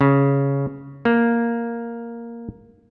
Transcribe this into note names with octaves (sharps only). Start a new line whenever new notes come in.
C#3
A#3